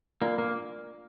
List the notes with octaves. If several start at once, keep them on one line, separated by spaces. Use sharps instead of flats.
A#3 D4 F4 A#4 D5
A#3